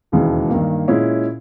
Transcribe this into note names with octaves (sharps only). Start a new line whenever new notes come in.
E1 D#2 C#3 E3 G#3
G2 D#3 A#3
A#2 G#3 C#4 E4